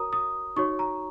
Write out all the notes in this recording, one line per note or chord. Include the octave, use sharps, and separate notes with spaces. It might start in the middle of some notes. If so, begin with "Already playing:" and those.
Already playing: F#4 A#4 C#5 A#5 D#6
D#6
D#4 F#4 C#5 C#6
A#5